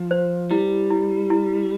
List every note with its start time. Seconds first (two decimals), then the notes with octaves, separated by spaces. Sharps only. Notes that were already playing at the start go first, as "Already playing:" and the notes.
Already playing: F3
0.11 C5
0.51 G3 E4
0.90 E4
1.30 E4